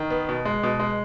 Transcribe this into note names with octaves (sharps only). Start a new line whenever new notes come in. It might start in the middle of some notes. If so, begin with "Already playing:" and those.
Already playing: D#3
B3
B2
G#3
B2
G#3